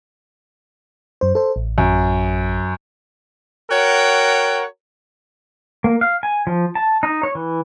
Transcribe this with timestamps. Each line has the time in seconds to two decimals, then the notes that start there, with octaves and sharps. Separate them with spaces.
1.21 F#2 C5
1.35 A4 C5
1.56 A1
1.78 F#2
3.70 F#4 A#4 C#5 F#5 G5
5.84 A#3
6.01 F5
6.23 G#5
6.47 F3
6.75 A5
7.03 D#4
7.23 C#5
7.35 E3